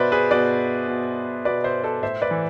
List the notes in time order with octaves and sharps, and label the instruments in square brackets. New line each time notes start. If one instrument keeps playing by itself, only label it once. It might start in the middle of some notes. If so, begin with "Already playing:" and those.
Already playing: [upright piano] B2 B4 C5 D5 E5
G#4 B4
B2 B4 D5
B2
B2 B4 D5
C5 E5
A4 C5
A2 C5 E5
B4 D5
E3